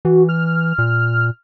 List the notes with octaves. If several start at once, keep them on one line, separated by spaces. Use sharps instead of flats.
E3 F#4
F6
A#2